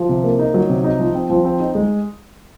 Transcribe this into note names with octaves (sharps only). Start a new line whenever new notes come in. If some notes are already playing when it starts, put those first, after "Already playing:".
Already playing: F3
C3
A#3
D#4
F#3
C3
D#4
F3
C4
F3
C4
D#4
G#3